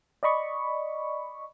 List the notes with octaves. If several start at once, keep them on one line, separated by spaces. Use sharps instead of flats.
D5 D#5 B5 C#6